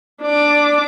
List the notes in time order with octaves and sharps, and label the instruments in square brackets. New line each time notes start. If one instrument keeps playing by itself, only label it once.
[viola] D4 D6